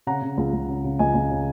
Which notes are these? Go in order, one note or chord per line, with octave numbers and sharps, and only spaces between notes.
C#3 F#5 A#5
C#3
C#2
C#2
C#3
C#3
C#2 D#5 G#5
C#2
C#3